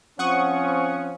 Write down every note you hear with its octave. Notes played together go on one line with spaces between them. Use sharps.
F3 C4 C#4 F#5 C#6 D#6